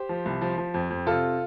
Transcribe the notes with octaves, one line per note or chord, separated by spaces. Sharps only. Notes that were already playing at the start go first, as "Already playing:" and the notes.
Already playing: G4 C5
F3
C2
F3
F3
F2
F2
C3 F4 A4